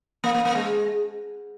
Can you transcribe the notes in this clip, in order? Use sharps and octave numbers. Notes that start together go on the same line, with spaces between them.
A#3
A#3
A#3
G#3